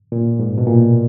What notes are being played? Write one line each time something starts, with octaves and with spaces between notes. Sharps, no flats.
A#2
G#2
B2
A#2